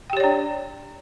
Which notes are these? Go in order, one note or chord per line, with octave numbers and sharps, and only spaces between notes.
D4 G4 C#5 D5 G5